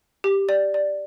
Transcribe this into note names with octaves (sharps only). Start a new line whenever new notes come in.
G4
D5
D5